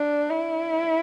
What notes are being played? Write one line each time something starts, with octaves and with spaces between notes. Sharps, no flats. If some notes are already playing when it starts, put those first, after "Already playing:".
Already playing: D4
E4